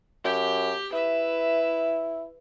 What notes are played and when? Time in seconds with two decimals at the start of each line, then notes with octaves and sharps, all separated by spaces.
0.24 F#2 G4 G5
0.93 E4 B4 E5